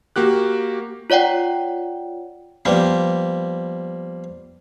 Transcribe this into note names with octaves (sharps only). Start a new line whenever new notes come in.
A#3 F#4 G4 F#6
F4 C#5 D5 F#5 G5
F3 G3 A#3 B3